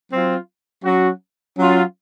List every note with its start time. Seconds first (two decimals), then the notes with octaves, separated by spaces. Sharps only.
0.11 F#3 C4 F4
0.83 F#3 C#4 F#4
1.57 F#3 C#4 F4